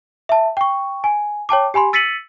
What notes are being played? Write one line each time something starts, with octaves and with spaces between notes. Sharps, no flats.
E5 A5
G5 C#6
G#5
C#5 G5 A5 D6
G4 G#5 B5 C6
E6 A6 B6 C#7 D#7 F#7